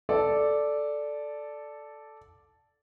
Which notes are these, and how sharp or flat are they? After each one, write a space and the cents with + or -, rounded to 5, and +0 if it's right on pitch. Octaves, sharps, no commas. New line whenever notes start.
A4 -5 D5 +0